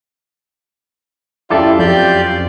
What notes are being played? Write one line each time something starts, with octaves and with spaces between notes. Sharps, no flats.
F#2 E4 F4 G4 A4 D5 E5
F2 G4 D5 G6